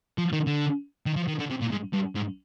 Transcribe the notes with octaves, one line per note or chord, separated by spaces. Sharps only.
F3
D#3
D3
D#3
F3
D#3
D3
C3
A#2
G#2
G2
G#2